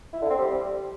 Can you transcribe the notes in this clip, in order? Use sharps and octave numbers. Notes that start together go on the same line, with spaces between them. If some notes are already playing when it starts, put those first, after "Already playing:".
E4
D3
C4
G3